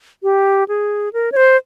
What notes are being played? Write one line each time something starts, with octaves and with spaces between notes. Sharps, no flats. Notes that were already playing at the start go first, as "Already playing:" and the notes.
G4
G#4
A#4
C#5
C5